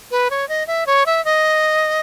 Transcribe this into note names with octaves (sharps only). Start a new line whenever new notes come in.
B4
C#5
D#5
E5
C#5
E5
D#5